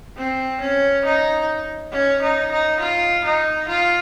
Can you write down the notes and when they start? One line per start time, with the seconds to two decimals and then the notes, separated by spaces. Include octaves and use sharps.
0.17 C4
0.61 C#4
1.05 D#4
1.92 C#4
2.22 D#4
2.52 D#4
2.80 F4
3.25 D#4
3.69 F4